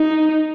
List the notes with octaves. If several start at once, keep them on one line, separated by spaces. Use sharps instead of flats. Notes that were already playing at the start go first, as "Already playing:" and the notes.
Already playing: D#4